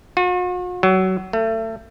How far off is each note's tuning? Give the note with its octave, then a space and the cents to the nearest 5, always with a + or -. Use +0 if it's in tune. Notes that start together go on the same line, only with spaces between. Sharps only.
F#4 -45
F#3 +20
A3 +30